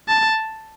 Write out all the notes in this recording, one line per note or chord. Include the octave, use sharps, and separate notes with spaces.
A5